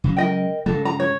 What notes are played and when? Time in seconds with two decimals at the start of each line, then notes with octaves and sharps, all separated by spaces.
0.04 C#3 F#3 G#3
0.17 A#4 D#5 G5
0.66 G2 C#3 G#3 A4
0.85 A#5
1.00 C#5